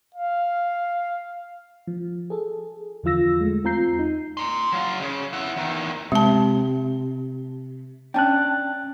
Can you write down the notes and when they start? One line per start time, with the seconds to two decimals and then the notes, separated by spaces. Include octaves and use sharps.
0.15 F5
1.87 F3
2.30 G#4 A4
3.03 E2 D3 F3 F4 E6 A#6
3.40 G#3 A3
3.64 E2 C4 F4 A#5 G6 C7
3.99 D#4
4.37 A#5 C6
4.73 F#3 F5
5.01 C#3
5.33 E4 F#5
5.57 E2 D#3
6.12 C3 G#3 A5
8.14 C#4 D4 G5 A5 F#6